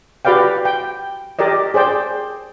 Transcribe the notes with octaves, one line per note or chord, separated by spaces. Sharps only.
F#4 G4 B4 D5 F5 G5
G5
G4 A#4 D5 D#5
G#4 C5 D5 G5